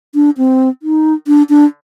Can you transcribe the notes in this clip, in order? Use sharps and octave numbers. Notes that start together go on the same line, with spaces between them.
D4
C4
D#4
D4
D4